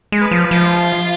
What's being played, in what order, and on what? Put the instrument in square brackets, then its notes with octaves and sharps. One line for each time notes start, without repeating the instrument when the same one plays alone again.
[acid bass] G#3
[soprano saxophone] B4
[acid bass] F3
[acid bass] F3 [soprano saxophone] F4